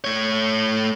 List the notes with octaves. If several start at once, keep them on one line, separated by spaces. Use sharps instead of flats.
A3 C#5